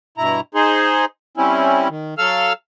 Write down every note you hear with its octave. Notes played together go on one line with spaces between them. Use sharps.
G2 B2 E4 A#5
D#4 G#4 C5
G3 C4 C#4 E4
D#3
F#3 A4 F5 E6 F6